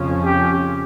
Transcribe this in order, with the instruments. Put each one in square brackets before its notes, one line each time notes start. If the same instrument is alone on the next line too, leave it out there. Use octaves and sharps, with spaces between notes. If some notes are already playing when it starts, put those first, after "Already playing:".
Already playing: [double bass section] F2 C#3 F3 C#4
[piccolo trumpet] G4